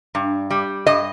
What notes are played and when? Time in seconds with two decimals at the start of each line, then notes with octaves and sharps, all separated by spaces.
0.15 G2
0.51 G3
0.87 G2 D#5